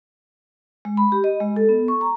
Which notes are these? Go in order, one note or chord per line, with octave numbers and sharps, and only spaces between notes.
G#3
B5
G4
D#5
G#3
A4
B3
C#6
A#5